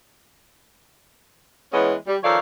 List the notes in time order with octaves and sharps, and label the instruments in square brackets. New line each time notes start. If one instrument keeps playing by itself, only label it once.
[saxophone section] E3 G#3 B3 C#4
G3
D#3 F3 A4 C#5 D5 F5